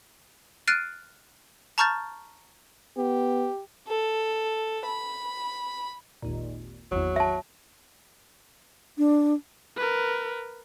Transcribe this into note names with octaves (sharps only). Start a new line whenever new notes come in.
F6 F#6 A6 C7 D7 D#7
A5 A#5 C#6 F6 G6 A6
B3 G4
A4
B5
G#1 D#2 A#2
G#1 E2 F#3
E5 A5
D4
A#4 B4